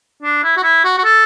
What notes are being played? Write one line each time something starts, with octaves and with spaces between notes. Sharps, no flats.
D4
E4
F#4
E4
F#4
F#4
A4